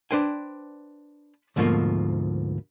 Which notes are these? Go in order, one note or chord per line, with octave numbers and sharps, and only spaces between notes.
D4 D#4 B4 C5 G5 G#5
D2 G#2 B2 F3 A3 A#3